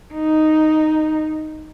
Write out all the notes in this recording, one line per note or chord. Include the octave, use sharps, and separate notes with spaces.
D#4